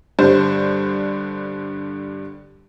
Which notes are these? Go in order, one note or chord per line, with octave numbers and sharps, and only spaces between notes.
G2 D3 C5